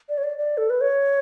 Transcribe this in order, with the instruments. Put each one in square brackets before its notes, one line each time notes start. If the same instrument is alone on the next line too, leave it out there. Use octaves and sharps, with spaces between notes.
[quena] D5
C#5
D5
D5
A4
B4
C#5